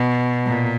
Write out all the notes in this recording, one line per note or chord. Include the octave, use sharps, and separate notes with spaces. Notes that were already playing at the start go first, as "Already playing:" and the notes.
Already playing: B2
A#2